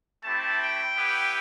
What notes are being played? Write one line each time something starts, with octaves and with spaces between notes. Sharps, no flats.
A3 C4 E4 G4 A5
G5
B3 E4 G4